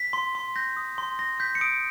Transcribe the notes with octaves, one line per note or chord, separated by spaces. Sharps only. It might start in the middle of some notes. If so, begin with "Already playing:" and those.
Already playing: B6
C6
C6
G6 A#6
D#6
C6
C6 A#6
G6 B6
C#7
D#6 D7